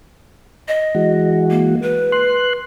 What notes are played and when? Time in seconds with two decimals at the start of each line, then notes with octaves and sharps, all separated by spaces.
0.68 D#5
0.95 E3 G#3 F#4
1.50 A#3
1.82 B4
2.12 C6 F#6